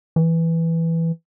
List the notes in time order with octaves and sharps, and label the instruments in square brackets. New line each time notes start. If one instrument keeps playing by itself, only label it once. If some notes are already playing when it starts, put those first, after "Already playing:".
[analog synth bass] E3